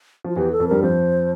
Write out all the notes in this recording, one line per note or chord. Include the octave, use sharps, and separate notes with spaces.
F3 F4
E2 E3 G4
A4
F2 F3
G2 G3 A#4
F2 F3 C5